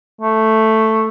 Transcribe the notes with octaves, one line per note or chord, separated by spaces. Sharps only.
A3